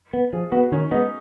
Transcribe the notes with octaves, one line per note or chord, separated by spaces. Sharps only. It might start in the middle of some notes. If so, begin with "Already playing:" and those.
B3
F3 G#4
B3 F#4
D#3 C#4
G#3 B3 D#4